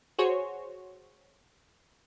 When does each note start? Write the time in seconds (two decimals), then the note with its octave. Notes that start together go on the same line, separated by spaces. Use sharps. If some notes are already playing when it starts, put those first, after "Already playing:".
0.19 F#4 G#4 C5 C#5